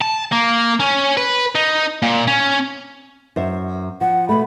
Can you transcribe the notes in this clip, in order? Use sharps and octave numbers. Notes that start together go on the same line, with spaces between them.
A5
A#3
C#4
B4
D#4
A#2
C#4
F#2 C5 E5
F3 F#5
B2 A3 B5